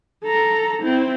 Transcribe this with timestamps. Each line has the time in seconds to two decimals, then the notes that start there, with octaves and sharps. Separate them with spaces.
0.24 A4 A#5
0.82 C4 E4